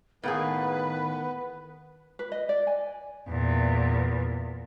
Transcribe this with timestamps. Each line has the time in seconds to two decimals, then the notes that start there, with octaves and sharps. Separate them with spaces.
0.24 A2 D#3 A#3 B3 G#4 B4
2.19 B4
2.32 D#5
2.49 D5
2.67 G#5
3.28 E2 A#2